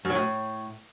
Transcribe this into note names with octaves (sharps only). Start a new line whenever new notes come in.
F#2
F#3
A2